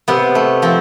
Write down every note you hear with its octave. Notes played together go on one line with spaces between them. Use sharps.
C3 B3
A3
F3 C4